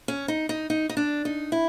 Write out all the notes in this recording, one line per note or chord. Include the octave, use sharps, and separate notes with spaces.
C#4
D#4
D#4
D#4
D#4
D4
D#4
E4